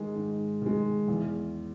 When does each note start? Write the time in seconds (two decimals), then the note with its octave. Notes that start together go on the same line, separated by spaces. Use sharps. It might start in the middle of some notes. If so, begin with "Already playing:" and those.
Already playing: G#2 D#3 G#3
0.15 G#2
0.62 D#3 G#3
1.08 E2